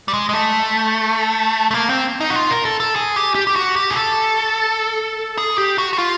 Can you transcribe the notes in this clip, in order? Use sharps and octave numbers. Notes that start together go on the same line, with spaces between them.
G3
G#3
G#3
A3
A3
A#3
C4
D#4
F#4
F4
A#4
A4
A4
G#4
G4
G4
G4
F#4
G4
G#4
A4
G#4
G4
F#4
F#4
F4